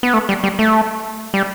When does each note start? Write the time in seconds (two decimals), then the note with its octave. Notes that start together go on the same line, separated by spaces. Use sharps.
0.03 B3
0.14 A3
0.29 G3
0.44 G3
0.59 A3
1.34 G3